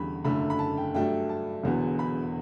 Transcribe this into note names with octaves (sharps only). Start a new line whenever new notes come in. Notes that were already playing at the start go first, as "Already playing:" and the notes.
Already playing: E2 D3 G3 C#4 B5
F#1 F#2 D3 A3 B5
B5
A5
G5
G2 F#3 A3 D4 G5
A5
E1 E2 D3 F#3 B3
B5